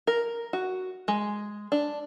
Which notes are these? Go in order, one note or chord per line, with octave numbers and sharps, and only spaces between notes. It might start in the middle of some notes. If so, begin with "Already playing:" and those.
A#4
F#4
G#3
D4